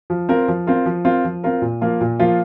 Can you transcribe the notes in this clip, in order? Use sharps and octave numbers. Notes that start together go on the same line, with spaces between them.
F3
C4 F4 A#4
F3
C4 F4 A#4
F3
C4 F4 A#4
F3
C4 F4 A#4
A#2
F3 A#3 F4
A#2
F3 A#3 F4